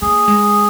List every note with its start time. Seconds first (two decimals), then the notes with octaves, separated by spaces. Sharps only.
0.02 A#3 G#4
0.28 G#3